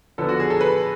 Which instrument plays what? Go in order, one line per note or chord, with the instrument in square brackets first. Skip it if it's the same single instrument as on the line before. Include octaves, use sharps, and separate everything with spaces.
[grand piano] D3 F3 B3 A4
F#4
G#4
A4
B4